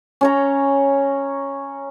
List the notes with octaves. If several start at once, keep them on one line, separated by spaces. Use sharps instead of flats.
C#4 C#5 A#5